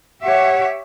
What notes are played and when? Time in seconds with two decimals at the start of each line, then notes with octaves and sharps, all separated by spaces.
0.23 G4 C#5 E5 F#5